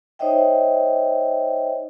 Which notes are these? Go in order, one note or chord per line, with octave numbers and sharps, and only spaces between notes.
D#4 C5 C#5 D#5 E5 G5